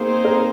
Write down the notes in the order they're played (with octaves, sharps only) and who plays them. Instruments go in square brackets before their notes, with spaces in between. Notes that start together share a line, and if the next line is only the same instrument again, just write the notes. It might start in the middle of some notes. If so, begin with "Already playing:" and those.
Already playing: [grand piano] A#3 [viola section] C4 D#4 G#4 C5
[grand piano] A#4